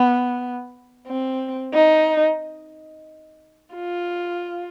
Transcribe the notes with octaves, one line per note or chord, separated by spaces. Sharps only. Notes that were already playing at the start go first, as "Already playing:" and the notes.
Already playing: B3
C4
D#4
F4